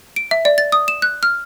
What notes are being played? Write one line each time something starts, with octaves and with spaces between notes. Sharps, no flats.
D7
E5
D5
A6
D#6
E7
F#6
F6